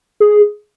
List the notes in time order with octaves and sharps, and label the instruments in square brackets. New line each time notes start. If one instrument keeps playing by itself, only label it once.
[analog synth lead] G#4